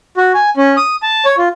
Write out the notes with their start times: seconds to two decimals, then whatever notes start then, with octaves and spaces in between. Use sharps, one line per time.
0.17 F#4
0.34 G#5
0.57 C#4
0.77 D#6
1.03 A5
1.25 C#5
1.38 F4